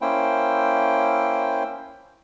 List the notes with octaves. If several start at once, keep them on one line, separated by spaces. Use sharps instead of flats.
A#3 C#4 E4 C5 G5